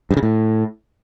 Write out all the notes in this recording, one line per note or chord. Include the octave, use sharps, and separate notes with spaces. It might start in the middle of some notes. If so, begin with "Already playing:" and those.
G2
C#3
A2